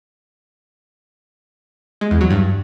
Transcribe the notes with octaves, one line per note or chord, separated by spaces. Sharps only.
G#3
E2
F#3
G2